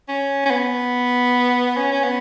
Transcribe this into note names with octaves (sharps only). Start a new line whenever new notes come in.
C#4
C#4
B3
C#4
C#4
B3